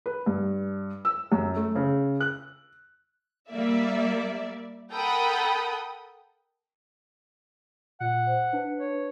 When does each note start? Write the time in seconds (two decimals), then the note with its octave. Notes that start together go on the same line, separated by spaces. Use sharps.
0.06 B4
0.26 G2
1.05 E6
1.32 F#2
1.56 A3
1.75 C#3
2.20 F#6
3.50 G3 A#3 D5 E5
4.91 A4 A#4 F#5 G5 B5 D#6
8.00 A#2 F#5
8.27 C5
8.53 D4 B4
8.78 C#5